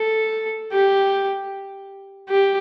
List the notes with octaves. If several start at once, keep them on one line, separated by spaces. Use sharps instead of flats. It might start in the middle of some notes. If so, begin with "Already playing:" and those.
Already playing: A4
G4
G4